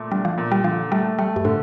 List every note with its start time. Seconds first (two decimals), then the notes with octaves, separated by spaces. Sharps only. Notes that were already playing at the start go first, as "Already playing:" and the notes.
Already playing: A#2 A3
0.11 G3 D4
0.25 F3
0.38 A#2
0.52 G3
0.64 D3 F3
0.91 G3 A3
1.19 G3 A3
1.36 G2
1.44 A2 D3